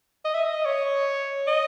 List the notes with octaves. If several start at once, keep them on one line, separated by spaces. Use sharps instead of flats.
D#5
E5
D#5
C#5
D#5